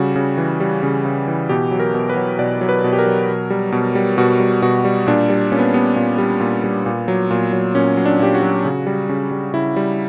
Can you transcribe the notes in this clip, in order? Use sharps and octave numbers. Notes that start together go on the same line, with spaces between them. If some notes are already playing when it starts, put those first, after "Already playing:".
Already playing: C#3 G3 F#4
C#3
E3
G3
C#3
C#3
E3
B2 G4
F#3
A#4
B2
B4
F#3
B2 D5
F#3
B4
B2
G4
A#4
F#3
B2
G3
B2
G3
B2 F#4
G3
B2 F#4
G3
A#2 D4
G3
A#2 C#4
B3
G3 B3
A#2
G3
A#2
G3
A#2
F#3
A#2
F#3
A#2 C#4
F#3
D4
A#2 G4
F#4
F#3
C#3
G3
C#3
G3
C#3 E4
G3